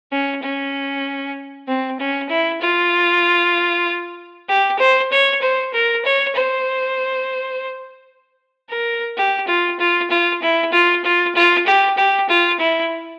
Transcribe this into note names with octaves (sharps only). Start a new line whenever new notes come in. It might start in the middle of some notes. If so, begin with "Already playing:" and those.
C#4
C#4
C4
C#4
E4
F4
G4
C5
C#5
C5
A#4
C#5
C5
A#4
G4
F4
F4
F4
E4
F4
F4
F4
G4
G4
F4
E4